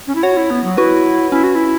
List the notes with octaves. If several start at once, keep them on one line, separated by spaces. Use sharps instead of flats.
C#4
E4
F#4 C#5 F#5
E4
B3
F#3
E4 F#4 B4
C#4 E4
F#4
E4